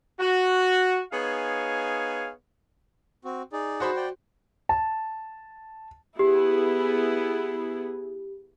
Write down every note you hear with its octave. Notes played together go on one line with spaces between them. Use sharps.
F#4
B3 D#4 G#4 C#5 F5 G#5
C4 F#4
D#4 G#4 D5
F#4 C5 B5
D5 G5
A5
B3 E4 G4 G#4